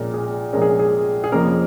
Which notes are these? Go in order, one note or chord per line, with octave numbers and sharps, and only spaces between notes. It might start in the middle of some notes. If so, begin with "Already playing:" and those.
Already playing: A#1 A#2 G#3 C#4 A#4
G#4
A#1 A#2 G#3 C#4 A#4
G#4
G#4
G#4
F2 C#3 F3 A#3 C#4 A#4